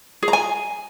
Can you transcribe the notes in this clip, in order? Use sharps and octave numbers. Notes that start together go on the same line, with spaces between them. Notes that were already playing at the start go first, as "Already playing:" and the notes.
G#4
A#5
G#5